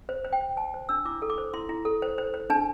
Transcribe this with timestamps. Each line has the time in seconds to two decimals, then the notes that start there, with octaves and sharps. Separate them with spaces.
0.09 C5
0.25 C5
0.33 G5
0.41 C5
0.57 C5 A5
0.74 C5
0.89 D4 E6
1.05 E4 D6
1.22 A4
1.30 D6
1.38 C5
1.54 E4 C6
1.69 E4
1.85 A4
2.02 C5
2.18 C5
2.34 C5
2.50 D4 A5